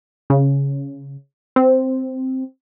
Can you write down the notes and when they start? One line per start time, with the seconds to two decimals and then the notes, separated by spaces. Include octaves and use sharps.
0.30 C#3
1.56 C4